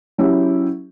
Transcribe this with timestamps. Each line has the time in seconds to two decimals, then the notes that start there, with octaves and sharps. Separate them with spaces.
0.18 F#3 C#4 E4 G4